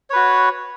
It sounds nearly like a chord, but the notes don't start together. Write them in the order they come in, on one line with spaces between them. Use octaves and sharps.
C#5 B4 F#4